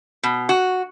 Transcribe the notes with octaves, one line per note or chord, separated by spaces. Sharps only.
B2
F#4